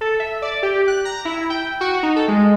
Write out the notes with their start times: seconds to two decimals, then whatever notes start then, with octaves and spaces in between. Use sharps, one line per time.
0.01 A4
0.20 E5
0.42 D5
0.63 G4
0.88 F#6
1.05 A#5
1.25 E4
1.50 G5
1.81 F#4
2.03 D#4
2.16 A4
2.28 G#3